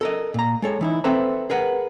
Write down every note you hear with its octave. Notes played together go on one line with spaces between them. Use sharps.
A4 A#4 D#5
A#2 A#5
G#3 A4 C#5
E3 D#4 E4
C4 A4 B4 C5 E5 A#5
G#4 A#4 B4 F#5